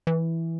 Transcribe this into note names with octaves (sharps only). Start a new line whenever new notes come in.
E3